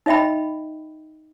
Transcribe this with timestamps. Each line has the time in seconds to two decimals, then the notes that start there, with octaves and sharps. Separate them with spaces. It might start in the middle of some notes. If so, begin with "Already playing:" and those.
0.06 D#4 D#5 E5 G5 B5